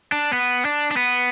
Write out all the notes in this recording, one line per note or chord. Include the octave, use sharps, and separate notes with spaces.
D4
B3
D4
D4
B3